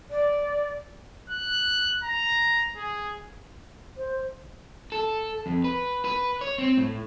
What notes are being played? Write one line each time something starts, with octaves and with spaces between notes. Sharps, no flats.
D5
F#6
A#5
G#4
C5
A4
F2
B4
B4
C#5
C4
A2